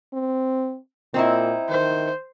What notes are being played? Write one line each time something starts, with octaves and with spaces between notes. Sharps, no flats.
C4
A#2 C4 D#4 E4
D#3 C5